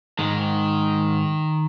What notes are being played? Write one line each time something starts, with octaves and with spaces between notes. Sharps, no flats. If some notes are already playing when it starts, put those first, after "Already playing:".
G#2 D#3 G#3